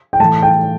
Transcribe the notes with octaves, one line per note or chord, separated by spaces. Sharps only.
G5
A2 E3 A5
G5